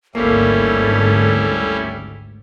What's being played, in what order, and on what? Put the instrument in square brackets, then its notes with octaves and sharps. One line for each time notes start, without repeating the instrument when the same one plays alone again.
[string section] G#1 D2 G#2 [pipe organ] G3 C#4 E4 [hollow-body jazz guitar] A#3 [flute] A4